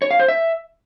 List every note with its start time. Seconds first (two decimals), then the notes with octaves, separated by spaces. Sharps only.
0.02 C#5
0.11 F5
0.20 C5
0.28 E5